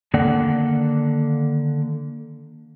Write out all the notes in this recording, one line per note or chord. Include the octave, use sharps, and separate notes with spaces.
D3 D#3 A#3 A4 D5 F#5